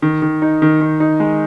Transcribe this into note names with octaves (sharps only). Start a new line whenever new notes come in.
D#3
D#3
D#4
D#3
D#3
D#4
G#3